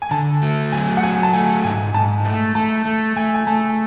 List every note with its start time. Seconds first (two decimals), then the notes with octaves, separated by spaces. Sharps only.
0.02 G#5
0.11 D3 A5
0.42 A3
0.72 F#3 G#5
0.97 F#5
1.02 F#3 G#5
1.23 A5
1.33 A3 G#5
1.64 G#2 G#5
1.94 G#2 A5
2.25 A3
2.55 A3 A5
2.85 A3
3.16 A3 G#5
3.35 G#5
3.47 A3 A5